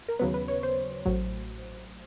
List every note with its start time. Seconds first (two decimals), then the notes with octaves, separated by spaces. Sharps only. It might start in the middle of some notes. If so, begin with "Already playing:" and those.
0.08 A#4
0.19 D#2 C#3 F#3 B3 B4
0.34 B4
0.48 C#5
0.63 C5
1.06 A1 A2 F#3